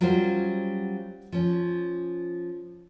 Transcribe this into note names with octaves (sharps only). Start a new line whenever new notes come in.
F#3 G3 C#4 F4 F#4 C5
F3 C#4